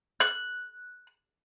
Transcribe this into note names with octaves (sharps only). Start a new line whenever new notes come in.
F#6